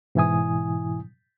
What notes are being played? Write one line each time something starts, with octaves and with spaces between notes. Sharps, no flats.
G#2 B2 E3 E4 G#5 D#6